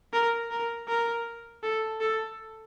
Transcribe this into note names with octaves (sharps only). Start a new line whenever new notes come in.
A#4
A#4
A#4
A4
A4